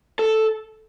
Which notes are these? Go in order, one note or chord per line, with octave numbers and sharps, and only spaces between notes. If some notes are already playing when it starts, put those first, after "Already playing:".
A4